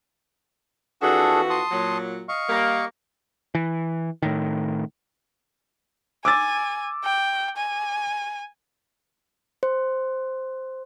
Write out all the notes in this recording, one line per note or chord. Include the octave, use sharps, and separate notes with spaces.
F2 E3 D4 F#4 G#4 A4
A5 C6 D#6
A#2 F#3
D#5 F5 C#6
G3 A#3
E3
A2 D#3
G#5 D6 E6 A6
G5
G#5
C5